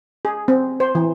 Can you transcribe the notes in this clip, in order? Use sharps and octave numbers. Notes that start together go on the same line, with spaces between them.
G#4
C4
C5
E3